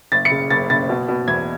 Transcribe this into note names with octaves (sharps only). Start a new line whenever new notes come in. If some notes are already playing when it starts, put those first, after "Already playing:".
F#1 A6
C#7
C#3
F#1 A6
F#1 A6
B2
B2
E2 G#6